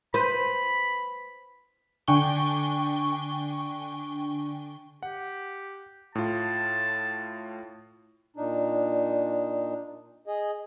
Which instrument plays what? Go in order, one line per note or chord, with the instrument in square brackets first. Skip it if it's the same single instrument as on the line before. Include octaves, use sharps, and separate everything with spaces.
[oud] B4 C5 [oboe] B5
[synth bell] D3 D4 G5 G#5 C#6 G7
[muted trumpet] G4 [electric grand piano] F#5
[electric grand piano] A2 F4 [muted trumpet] A5
[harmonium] A#2 D4 D#4
G#4 D#5